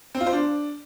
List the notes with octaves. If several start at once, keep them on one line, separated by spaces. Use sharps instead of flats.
C4
F4
C5
D4